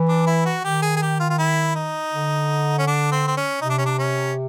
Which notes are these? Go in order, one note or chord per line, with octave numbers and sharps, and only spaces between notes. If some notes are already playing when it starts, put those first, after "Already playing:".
Already playing: E3
D4
E4
F#4
D#3 G4
G#4
G#4
G4
F4
F4
E4
D#4
D3
C#4
D4
C4
C4
C#4
C3 D#4
D4
C#4
D4
C#4